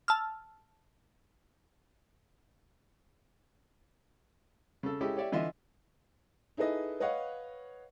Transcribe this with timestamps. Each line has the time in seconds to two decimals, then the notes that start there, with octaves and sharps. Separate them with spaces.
0.08 A5 E6 F6
4.83 C#3 A4
5.01 G#3 C#4 E4 G4 A4
5.17 G4 C#5 D5 E5
5.32 D3 E3 F4 D#5 E5
6.57 D#4 E4 G#4 A4 B4 D#5
7.00 B4 C#5 D#5 F5 F#5